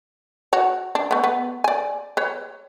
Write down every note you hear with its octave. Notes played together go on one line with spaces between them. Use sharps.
F#4 C#5
D4
A3 B3
B3
D5 G#5
B4 C#5